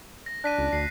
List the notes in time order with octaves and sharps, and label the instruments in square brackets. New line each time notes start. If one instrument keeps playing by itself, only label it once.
[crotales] A#6
[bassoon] D4 [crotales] F#6 B6 D#7
[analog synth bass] C#2
[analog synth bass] D2 [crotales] C7